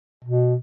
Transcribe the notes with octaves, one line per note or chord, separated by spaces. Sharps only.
B2